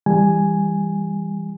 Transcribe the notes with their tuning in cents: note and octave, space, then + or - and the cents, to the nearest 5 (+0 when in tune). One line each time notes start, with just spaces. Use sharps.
E3 +0 G3 +20 G#5 +0